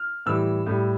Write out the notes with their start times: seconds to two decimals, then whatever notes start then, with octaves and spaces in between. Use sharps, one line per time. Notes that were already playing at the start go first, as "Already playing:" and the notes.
Already playing: F6
0.26 A2 E3 G3 E6
0.66 A2 G3